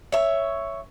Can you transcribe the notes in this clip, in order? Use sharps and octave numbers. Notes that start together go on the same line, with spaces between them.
C#5 E5